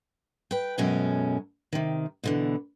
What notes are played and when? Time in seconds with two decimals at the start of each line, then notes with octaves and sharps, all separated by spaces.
0.51 B4 G5
0.78 F#2 B2 G#3 C#4 A4 A#4
1.73 C3 D#3
2.23 B2 D3 E3